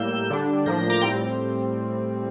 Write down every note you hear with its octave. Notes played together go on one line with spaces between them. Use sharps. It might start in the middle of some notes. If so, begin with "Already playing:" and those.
Already playing: A2 G3 A#3 E6 G6
D3 G3 D4
A2 F3 A#3 D4 G6 A#6
G6 A#6
A#5 D6
A2 G3 C4 G5 A#5